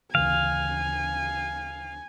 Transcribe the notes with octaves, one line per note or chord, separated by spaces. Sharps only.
D2 C#3 E3 F5 G#5